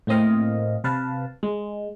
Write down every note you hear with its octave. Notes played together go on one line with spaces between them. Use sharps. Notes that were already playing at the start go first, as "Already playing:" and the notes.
A2 A#3 C4 D#5 F5
C3 B4 F5 A5
G#3